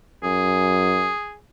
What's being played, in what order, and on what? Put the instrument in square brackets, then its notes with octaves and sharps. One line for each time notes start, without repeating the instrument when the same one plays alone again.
[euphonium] F#2 [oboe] G#4